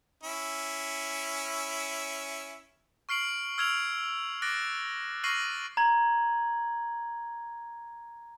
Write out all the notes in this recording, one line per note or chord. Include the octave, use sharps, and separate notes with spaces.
C#4 E4
C#6 F6 C7 D7 F#7
E6 F6 G#6 D7 F7 F#7
D6 F6 F#6 A6 A#6 D7
C#6 F6 A#6 C7 D#7 F#7
A#5 G#6 F#7